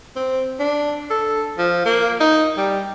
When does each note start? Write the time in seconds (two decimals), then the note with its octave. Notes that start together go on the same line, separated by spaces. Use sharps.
0.16 C4
0.60 D4
1.10 A4
1.58 F3
1.86 A#3
2.20 D#4
2.58 G3